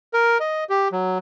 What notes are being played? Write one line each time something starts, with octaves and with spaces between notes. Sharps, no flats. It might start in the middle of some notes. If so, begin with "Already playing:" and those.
A#4
D#5
G4
F#3